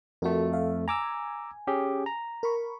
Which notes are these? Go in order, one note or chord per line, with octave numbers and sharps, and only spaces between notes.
F2 A3 F#4 A#4
E5 F5
G#5 A#5 D6 E6
C#4 G4 G#4
A#5
A#4 B5 C#6